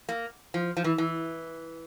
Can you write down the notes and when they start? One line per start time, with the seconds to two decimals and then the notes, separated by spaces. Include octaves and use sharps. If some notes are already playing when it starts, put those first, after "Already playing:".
0.09 A#3
0.54 F3
0.77 F3
0.84 E3
0.98 E3